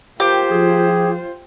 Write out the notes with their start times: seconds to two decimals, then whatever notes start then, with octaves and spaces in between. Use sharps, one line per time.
0.20 F4 G4 A#4 C5 F5 G5
0.51 F3 G#4